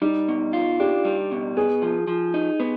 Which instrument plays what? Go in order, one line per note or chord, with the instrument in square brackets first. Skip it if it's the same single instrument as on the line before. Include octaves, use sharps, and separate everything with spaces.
[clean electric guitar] G3 [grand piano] D#4
[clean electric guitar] B2
F4
[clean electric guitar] D4 [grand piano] G4
[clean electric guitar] G3
B2
[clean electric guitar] B3 [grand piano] G#4
[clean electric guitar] F3
F3
D#4
B3